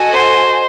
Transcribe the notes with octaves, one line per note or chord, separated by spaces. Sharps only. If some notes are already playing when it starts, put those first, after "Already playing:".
Already playing: F#4 A4 D#5 G#5
C5